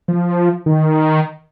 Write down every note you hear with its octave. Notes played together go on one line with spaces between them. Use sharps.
F3
D#3